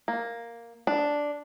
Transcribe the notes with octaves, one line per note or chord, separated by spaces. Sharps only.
A#3
D4